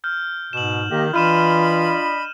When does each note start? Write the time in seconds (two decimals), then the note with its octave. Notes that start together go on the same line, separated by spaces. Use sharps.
0.04 F6 G6
0.53 G#2 B2 E7 F#7
0.90 D#3 A#3 G4 D#5
1.14 E3 D4 F4 D#5 B5 F6 D#7 E7